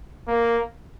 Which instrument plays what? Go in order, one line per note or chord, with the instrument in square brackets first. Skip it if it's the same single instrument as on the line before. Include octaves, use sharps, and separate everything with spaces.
[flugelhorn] A#3